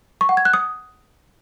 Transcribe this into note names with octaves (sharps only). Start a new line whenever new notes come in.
C#6
F#5
G#6
F#6
D#6